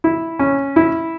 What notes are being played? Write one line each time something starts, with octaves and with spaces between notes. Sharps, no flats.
E4
C#4
E4